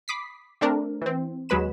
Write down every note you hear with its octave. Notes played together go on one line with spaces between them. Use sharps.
B5 D6 D#6 B6 C7
A3 C4 D4 A#4
E3 C4
D#2 F#3 G#3 B4 B5 E7